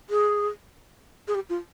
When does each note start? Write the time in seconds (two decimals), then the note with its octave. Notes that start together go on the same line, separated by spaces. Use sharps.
0.10 G#4
1.28 G#4
1.35 G4
1.49 F4